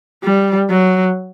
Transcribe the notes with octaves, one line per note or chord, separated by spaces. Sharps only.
G3
F#3